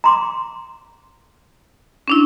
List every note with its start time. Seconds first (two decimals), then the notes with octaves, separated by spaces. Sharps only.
0.04 A#5 C6 D6
2.08 C#4 D4 E4